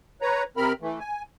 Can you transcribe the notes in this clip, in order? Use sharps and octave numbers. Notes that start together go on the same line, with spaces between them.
B4 C#5 A#5
C3 C4 A#4 B5 F6
E3 A3
G#5